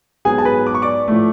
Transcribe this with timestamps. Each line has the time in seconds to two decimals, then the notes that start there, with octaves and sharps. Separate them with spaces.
0.25 G#2 F#3 B3 G#4 G#5
0.38 A5
0.45 B4 B5
0.67 D6
0.75 C#6
0.82 D5 D6
1.08 A2 F3 A3